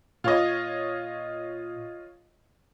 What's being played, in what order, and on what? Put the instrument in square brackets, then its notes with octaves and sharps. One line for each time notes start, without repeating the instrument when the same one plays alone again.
[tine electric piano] A#2 [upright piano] F4 C#5 D#5